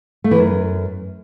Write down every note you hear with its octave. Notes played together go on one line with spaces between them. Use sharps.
A3
E3
F#2